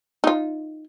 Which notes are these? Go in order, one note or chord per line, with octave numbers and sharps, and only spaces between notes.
D#4 F4